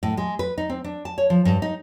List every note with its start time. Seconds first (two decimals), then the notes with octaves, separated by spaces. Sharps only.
0.03 A2
0.17 G#3
0.39 B4
0.58 D#4
0.70 C4
0.84 D4
1.05 A5
1.18 C#5
1.30 F3
1.45 G2
1.62 D#4